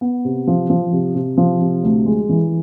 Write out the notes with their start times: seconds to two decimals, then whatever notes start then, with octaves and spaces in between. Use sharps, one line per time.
0.01 B3
0.25 C3
0.47 F3
0.70 F3
0.93 C3
1.15 C3
1.38 F3
1.61 C3
1.83 D2
2.06 G#3
2.29 E3